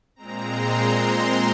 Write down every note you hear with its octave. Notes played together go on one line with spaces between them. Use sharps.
A#2 G#3 C4 A#5
C6
C6